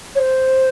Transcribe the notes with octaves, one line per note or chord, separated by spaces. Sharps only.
C#5
C5